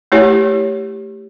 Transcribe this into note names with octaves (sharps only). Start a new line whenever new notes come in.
A3 E4 G4 C#5